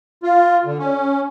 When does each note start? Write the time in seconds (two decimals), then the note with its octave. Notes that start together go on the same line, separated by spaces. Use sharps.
0.23 F4
0.65 D3
0.79 C#4